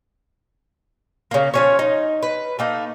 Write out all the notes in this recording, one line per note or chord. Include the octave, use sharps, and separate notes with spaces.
C#3 A#3
F3 C#4 C#5
D#4
B4
A3 A#3 D#4